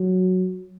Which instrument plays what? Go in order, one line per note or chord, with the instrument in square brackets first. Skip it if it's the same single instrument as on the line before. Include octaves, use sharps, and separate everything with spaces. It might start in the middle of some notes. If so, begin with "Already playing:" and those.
Already playing: [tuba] F#3